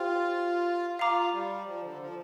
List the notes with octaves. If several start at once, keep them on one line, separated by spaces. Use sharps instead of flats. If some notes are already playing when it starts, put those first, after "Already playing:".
Already playing: F4 G4 C5 G5
F4 F5 A#5 D6
G3
F3
D3
F3